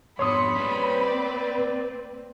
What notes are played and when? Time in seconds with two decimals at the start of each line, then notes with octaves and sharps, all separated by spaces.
0.19 F2 G#2 B2 C#5 B5 C6 D#6 C#7
0.56 G3 A#3 C4 C#4 B4
1.03 D5